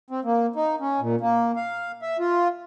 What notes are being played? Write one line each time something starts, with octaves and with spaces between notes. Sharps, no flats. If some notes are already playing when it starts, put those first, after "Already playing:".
C4
A#3
D#4
C#4
A#2
A#3
F5
E5
F4